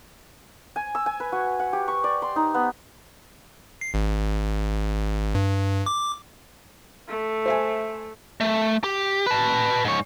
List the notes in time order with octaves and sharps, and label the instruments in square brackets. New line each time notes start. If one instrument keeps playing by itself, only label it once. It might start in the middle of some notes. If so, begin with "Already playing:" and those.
[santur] G#5
E6
G#5
B4
F#4
F#5
G4
C#6
D5
C6
D#4
B3
[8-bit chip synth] C7
G#1
G2
D6
[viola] A3
[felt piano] C5 E5 G#5
[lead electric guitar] A3
G4
B4 A5
G#2 C#5